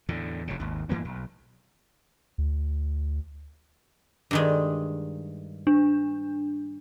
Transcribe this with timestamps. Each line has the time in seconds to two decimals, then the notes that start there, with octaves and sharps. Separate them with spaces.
0.09 E2 A2 D3
0.47 F1 F2 C#3
0.60 G#1 D#2
0.89 G2 E3 A#3 B3
1.05 B1
2.38 D2
4.31 G2 D#3 G#3
5.67 D4